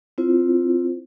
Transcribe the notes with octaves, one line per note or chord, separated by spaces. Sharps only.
C4 E4 F4 C5